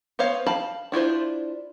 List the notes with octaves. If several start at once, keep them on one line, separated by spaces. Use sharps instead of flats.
B3 C5 C#5 F5
F5 G5 A5 B5
D4 E4 F4 C5